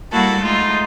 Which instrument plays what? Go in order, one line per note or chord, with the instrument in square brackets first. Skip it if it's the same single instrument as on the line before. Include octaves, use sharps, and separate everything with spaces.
[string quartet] G3 A#3 E4 F#4 A4
G#3 A3 D#4 F4